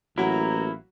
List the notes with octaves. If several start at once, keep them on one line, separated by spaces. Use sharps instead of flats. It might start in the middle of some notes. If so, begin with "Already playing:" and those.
A1 F#3 A#3 E4 F#4 A#5